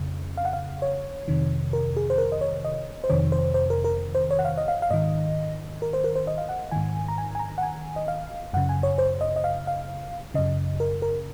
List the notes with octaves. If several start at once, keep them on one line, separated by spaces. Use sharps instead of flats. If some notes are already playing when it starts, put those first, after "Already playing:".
Already playing: F2 C#3
F5
F#5
F5
C#5
F2 C3 D#3
A#4
G#4
C5
A#4
D#5
C#5
D#5
C5
F2 C3 D#3 C#5
C5
C5
A#4
A#4
C5
C#5
F#5
F5
D#5
F5
F5
G#2 D#3 D#5
A#4
C5
A#4
C5
D#5
F5
F#5
G#2 D#3 G#5
A#5
G#5
G#5
A#5
F#5
G#5
D#5
F5
F#2 C#3 F#5
G#5
C#5
C5
D#5
D#5
F5
F5
F#2 C#3 D#5
A#4
A#4